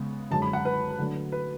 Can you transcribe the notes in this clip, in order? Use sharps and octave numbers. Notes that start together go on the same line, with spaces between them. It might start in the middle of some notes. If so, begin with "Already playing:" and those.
Already playing: C#3 G#3 B3
F#2 D3 G#3 C#4 A5
B5
F#5
B4
D3 F#3 A3 D4
B4